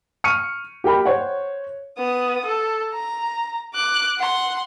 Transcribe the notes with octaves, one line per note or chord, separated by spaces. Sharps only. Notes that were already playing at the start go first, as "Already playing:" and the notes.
C#6 F6 C#7 D#7
G4 A#4 G5 B5
C5 C#5 F#5
B3 D#6
A4
A#5
D6 F#6
F#5 C6